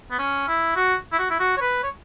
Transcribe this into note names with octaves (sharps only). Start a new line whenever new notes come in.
B3
C#4
E4
F#4
E4
F#4
E4
F#4
C#5
B4
C#5